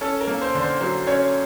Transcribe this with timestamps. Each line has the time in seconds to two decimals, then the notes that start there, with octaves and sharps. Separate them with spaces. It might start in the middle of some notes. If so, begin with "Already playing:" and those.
0.01 C#4 A4
0.21 A#4
0.27 A#3
0.42 C5
0.55 D3
0.61 C5
0.80 F#3 C5
1.07 C#4 C#5